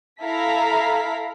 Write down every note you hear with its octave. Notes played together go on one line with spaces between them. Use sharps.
E4 A4 F5 A#5 B6